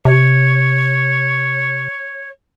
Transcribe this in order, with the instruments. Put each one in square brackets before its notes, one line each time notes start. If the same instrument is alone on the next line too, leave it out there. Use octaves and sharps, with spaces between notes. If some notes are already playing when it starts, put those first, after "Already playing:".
[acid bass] C3 [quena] C#5